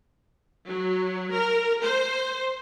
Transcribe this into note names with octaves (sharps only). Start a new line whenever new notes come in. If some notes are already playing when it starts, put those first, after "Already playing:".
F#3
A#4
C5